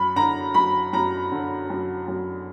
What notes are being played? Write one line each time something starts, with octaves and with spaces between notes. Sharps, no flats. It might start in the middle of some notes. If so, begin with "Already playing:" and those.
Already playing: F#2 B5
D3 A#5
F#2 B5
F#2 A#5
D3
F#2
F#2